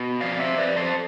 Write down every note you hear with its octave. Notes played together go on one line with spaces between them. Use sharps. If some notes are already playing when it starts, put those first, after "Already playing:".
Already playing: B2
F2 D5 F5
C5 E5
F2 B4 D5
A4 C5